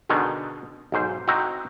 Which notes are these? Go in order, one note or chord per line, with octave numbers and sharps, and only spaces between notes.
B2 D3 D#3 G#3
B1 G#2 C5
C4 D#4 E4 F#4